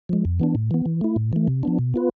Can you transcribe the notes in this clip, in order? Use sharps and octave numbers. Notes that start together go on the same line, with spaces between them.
F3 G#3
F2
E3 B3 D4
A2
E3 B3
E3
A3 E4
A2
E3 A3
C3
F3 B3 D4
B2
B3 F4 B4